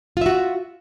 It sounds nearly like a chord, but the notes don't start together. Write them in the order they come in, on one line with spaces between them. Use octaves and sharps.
F4 E5 F#4